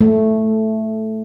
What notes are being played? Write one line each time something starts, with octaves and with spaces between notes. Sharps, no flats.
A3